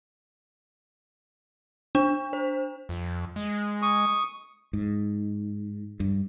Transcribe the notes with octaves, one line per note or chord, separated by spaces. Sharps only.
D4
C5
F2
G#3
C#6 D#6
G#2
G2